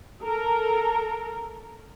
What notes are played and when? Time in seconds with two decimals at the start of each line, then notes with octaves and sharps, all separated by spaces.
0.22 A4 A#4 A#5